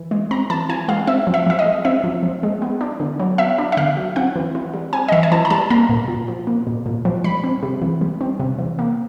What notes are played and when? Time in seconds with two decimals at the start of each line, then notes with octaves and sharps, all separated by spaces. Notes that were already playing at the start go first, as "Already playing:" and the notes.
Already playing: E3
0.11 G#3
0.31 C4 A#5
0.50 E3 A5
0.69 E3 G#5
0.88 G#3 F5
1.07 C4 E5
1.27 F3
1.34 E5
1.47 F3 E5
1.59 D#5
1.66 G#3
1.85 C4 E5
2.04 F3
2.23 F3
2.43 G#3
2.62 B3
2.81 D4
3.00 D3
3.20 F#3
3.38 B3 E5
3.58 D4
3.72 E5
3.77 D3 F5
3.97 F#3
4.16 C4 F#5
4.36 E3
4.55 E3
4.74 G3
4.93 C4 G#5
5.08 D#5
5.12 E3 E5
5.23 G#5
5.32 E3 A5
5.45 A#5
5.50 G3 A5
5.70 A#3 A#5
5.89 A#2
6.08 A#2
6.28 F3
6.47 A#3
6.67 A#2
6.86 A#2
7.05 F3
7.24 G3 B5
7.44 C4
7.63 C3
7.82 E3
8.01 G3
8.21 C4
8.40 C3
8.59 E3
8.79 A#3